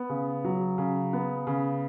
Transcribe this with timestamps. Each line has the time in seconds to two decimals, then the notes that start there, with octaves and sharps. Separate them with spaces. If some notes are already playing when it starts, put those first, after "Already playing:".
Already playing: B3
0.09 C#3
0.44 F#3
0.78 C#3
1.13 B3
1.47 C#3